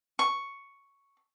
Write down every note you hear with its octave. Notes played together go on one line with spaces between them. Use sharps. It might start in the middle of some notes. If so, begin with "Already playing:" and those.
C#6